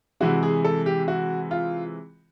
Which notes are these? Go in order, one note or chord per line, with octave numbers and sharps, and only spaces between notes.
C3 E3 G#3 F#4
G#4
A4
G4
F#4
F4